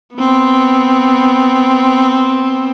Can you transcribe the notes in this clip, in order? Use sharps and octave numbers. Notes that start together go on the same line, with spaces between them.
B3 C4